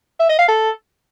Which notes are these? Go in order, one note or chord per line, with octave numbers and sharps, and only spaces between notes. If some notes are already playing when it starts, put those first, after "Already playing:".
E5
D#5
F5
A4